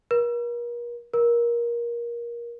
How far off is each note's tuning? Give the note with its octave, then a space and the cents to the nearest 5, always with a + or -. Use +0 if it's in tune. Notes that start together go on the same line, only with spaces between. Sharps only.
A#4 +40
A#4 +20